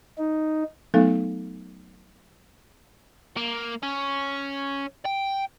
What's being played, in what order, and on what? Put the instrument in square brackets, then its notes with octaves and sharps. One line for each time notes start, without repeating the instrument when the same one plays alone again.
[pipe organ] D#4
[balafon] F#3 A3 B3 D#4 A4 F5
[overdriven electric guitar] A#3
C#4
G5